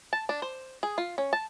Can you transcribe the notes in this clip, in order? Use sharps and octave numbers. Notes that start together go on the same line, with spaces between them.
A5
D4
C5
G#4
F4
C#4
A5